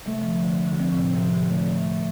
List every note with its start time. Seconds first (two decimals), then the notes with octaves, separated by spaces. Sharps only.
0.07 C3 A3
0.21 F3
0.25 D3
0.37 F3
0.43 D2 D3
0.68 D3
0.79 F3 C4
0.92 A2
0.97 C3
1.15 C3 F3
1.33 D3
1.50 A3